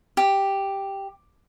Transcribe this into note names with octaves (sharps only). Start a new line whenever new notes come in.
G4